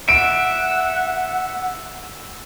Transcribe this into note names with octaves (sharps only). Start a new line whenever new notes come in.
E5 F#5 D7